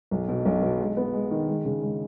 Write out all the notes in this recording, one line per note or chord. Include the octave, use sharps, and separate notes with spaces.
B1
B2
B1
B2
G#3
B3
G#3
D#3
G#3
C#3
G#3